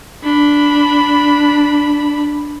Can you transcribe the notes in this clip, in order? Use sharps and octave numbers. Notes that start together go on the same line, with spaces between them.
D4 B5